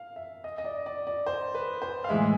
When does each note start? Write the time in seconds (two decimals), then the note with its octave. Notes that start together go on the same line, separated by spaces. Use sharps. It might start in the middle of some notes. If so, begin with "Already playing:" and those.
Already playing: F5
0.16 E5
0.44 D#5
0.58 D#5
0.64 D5
0.86 D5
1.07 D5
1.26 C5
1.55 B4
1.82 C5
2.04 F5
2.09 A2 E3 G#3 E5